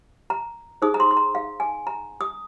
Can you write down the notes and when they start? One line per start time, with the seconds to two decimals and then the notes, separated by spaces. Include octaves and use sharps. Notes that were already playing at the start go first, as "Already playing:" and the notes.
0.30 A#5
0.82 D#4 G#4 C5 D#6
0.94 A#5
1.00 C6
1.11 C6
1.17 A#5
1.35 F5
1.60 G#5
1.87 A#5
2.21 D#6